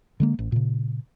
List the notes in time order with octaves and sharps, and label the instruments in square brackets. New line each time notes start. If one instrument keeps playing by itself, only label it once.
[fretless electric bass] D3 G#3 A#3
A1
A#2 C#3